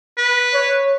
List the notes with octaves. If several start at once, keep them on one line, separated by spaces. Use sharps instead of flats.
B4
C#5